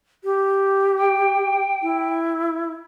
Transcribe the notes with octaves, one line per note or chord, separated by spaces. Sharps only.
G4
G5
E4